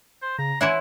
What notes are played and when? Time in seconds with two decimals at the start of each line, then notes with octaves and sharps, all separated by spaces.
0.22 C5
0.38 C#3 A#5
0.61 E3 E4 C#5 E5 F#5 G#5 C6